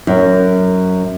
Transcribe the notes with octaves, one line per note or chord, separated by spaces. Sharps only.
F#2